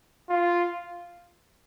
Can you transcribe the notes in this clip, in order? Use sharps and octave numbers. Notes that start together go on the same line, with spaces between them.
F4